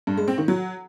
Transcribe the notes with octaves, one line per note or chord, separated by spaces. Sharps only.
G2
G#3
C4
D#3
F#3